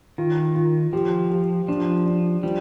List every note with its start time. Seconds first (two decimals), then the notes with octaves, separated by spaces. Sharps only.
0.18 D#3 F4
0.55 F4
0.93 F3 G4
1.30 G4
1.68 F3 D4
2.05 D4
2.43 F3 G3